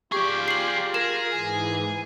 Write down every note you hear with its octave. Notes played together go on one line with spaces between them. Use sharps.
F4 G4 G#4 D5 C#6
C7 F#7
G#4 A#4 E7
G#2 E3 G#5